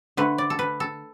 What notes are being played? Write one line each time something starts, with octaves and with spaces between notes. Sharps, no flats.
D3 A3 B4
D5
A4
B4
A4